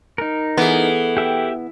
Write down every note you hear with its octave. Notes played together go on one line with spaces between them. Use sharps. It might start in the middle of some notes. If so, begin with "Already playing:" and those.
D#4 A#4
E3 B3 G#4 A4
G4 E5 G5